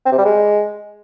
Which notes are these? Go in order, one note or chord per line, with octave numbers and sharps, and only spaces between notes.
C4
C3
G3
G#3